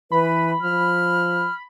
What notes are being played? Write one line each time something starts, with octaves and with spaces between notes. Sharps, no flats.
E3 B4 B5
F3 F6